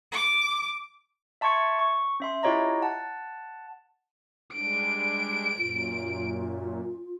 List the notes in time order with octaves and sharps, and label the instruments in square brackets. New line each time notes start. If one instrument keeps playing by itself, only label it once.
[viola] D6
[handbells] E5 A5 C6 C#6 G#6 C#7
C#6
C#4 E5 C6
E4 F4 G4 C#5 D#5 A#5
F#5 A5
[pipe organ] G3 G#3 D4 [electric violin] D7
[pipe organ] F#2 A#2 [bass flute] F4